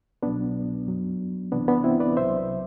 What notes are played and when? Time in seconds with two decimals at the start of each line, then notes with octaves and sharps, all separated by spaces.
0.23 C2 B2 F#3 B3 D4
0.87 F#2 F#3
1.52 C2 C3 E3 B3 D4
1.68 B3 D4
1.84 C4 E4
2.00 B4 D5
2.17 C2 C3 F#3 C5 E5